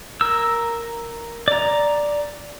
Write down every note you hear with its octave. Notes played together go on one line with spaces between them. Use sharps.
A#4 E6
D5 A#5